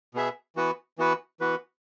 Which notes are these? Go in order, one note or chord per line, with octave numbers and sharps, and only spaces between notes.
B2 B3 G#4 E5
E3 B3 F#4 B4
E3 B3 F#4 B4
E3 B3 F#4 B4